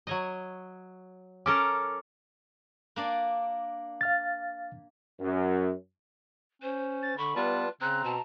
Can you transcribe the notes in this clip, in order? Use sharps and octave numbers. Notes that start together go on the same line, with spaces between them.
F#3 C#5 D#5
C#4 A4 A#4 D6
A#3 D4 D5
F5 F6 A6
F#2
C#4 C5
A6
D3 B5 C#6
G3 B3 F4 B4 A5
C#3 C4 A#5 F#6
B2 A5